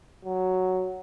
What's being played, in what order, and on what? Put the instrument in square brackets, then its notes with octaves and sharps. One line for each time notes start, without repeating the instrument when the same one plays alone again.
[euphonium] F#3